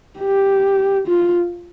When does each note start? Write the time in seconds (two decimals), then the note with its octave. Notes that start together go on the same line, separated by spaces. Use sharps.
0.19 G4
1.06 F4